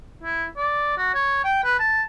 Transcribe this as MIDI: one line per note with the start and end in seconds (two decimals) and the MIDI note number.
0.23 0.46 64
0.57 0.97 74
0.98 1.14 66
1.14 1.39 73
1.44 1.64 79
1.64 1.75 71
1.79 2.03 81